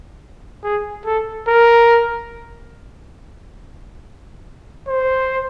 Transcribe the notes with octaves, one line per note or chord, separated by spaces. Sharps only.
G#4
A4
A#4
C5